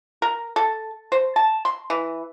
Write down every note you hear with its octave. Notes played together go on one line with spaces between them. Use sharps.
A#4
A4
C5
A5
C6
E3